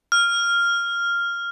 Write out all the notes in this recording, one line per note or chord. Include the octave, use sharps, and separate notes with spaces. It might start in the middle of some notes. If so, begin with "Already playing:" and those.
F6